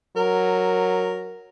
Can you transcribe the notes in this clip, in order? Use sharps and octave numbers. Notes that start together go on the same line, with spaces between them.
F#3 A#4